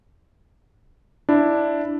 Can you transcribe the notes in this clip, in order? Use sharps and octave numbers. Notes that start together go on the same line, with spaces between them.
D4 E4